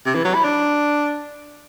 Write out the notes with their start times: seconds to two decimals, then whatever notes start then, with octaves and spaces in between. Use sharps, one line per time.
0.05 C3
0.15 E3
0.25 F#3
0.34 E4
0.44 D4